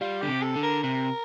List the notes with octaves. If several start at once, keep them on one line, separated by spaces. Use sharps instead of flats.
G3 F4
D3 G4
C3
A4
D3
A#4
C3 A#4